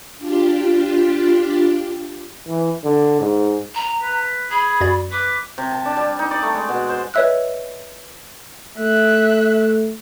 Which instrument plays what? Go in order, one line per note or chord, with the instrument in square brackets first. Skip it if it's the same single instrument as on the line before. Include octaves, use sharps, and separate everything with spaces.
[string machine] D4 F4 G4
[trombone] E3
D3
G#2
[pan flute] A#5
[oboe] B4
[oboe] G#4 [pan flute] B5
[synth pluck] F#2 F#4 D5
[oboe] B4 [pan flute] D6
[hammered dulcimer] C3
A5
D4
G3
D#4
D5
A3
G#3
B2
C5
[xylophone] B4 C#5 D#5 E5 E6 F#6
[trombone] A3 [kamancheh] E5 F#6